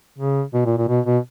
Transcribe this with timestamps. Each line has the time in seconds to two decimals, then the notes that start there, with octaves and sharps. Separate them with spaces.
0.19 C#3
0.54 B2
0.65 A#2
0.77 A#2
0.88 B2
1.06 B2